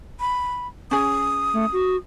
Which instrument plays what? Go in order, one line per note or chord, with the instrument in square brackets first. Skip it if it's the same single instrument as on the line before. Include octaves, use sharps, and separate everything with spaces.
[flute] B5
[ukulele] C#4 G#4 [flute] D#6
[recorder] A3
F#4